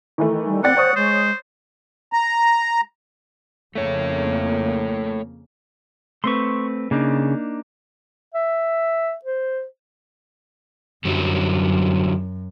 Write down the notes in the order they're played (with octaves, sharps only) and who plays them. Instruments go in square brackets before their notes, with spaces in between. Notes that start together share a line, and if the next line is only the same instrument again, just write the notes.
[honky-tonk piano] D#3 E3 A3
[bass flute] G3
[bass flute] C4 [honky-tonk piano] D5 G5 A6 [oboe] F#5
[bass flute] C5 [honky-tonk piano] C#5 C#6 D#6
[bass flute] G#3 [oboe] C5
[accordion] A#5
[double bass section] F2 C#3 A#3 [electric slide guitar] A3 C#5
[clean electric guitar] A3 C4 B4 [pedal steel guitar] C6 C#6
[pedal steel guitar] C#3 [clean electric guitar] A#3 D4 D#4
[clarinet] E5
C5
[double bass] F#2 [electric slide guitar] D3 F#3 G3